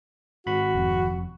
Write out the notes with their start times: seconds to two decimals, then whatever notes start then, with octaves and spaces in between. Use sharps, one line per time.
0.47 G#1 F#4 B5
0.75 F1 F2